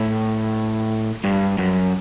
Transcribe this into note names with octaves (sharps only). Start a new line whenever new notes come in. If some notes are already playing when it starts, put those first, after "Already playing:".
Already playing: A2
G2
F#2